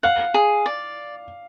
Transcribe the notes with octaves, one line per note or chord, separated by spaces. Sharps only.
F5 F#5
G#4
D5